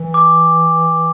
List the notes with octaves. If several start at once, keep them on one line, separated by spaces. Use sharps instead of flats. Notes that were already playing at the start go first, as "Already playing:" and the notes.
Already playing: E3
D6